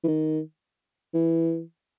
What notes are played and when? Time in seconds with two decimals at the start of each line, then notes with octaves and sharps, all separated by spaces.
0.04 E3
0.08 D#3
1.14 E3